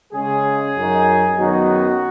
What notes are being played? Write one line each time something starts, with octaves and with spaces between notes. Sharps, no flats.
C#3 G#3 C#4 G#4
F#2 F#3 D#4
F#2 D#3 F#3 B3 D#4 F#4